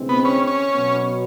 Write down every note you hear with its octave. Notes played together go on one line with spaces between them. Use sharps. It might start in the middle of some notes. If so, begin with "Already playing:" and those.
Already playing: D2 C3 E3 G#3 C4
B3
C#4
C#4
B2 F#3 B3